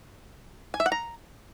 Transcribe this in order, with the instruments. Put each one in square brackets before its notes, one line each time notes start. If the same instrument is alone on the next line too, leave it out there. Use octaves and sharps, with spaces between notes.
[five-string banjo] G#5
E5
F#5
A#5